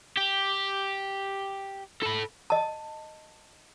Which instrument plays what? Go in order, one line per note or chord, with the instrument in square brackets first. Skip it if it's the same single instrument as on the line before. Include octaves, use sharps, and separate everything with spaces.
[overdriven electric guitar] G4
A4 B5
[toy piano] D#5 A5